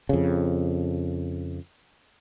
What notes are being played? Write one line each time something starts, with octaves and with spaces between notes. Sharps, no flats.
F2 C#3